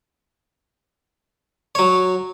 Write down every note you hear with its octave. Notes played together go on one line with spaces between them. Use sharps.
F#3 C#5